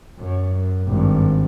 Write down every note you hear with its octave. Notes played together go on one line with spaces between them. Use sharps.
F#2
G#1 G2